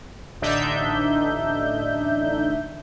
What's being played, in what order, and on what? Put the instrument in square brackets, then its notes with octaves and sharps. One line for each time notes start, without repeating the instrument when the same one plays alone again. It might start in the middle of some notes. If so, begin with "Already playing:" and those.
[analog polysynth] A1 D3 D4 D#4 E5 G6